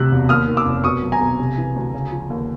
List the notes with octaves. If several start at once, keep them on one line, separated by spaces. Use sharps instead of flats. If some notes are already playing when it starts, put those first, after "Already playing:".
Already playing: D2 C3 E6 F#6
E1
D#2 D#6 F6
D#3
D6 E6
F1
B2 C#6 D#6
F#3
G#5 A#5
B1
C3
E3
D2
C#3
F3
D#2